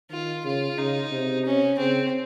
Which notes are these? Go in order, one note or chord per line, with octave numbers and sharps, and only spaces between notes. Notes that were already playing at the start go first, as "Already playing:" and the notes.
D#3 F4
C#3 F4
C#3 D#4
C3
C#4
C#3 C4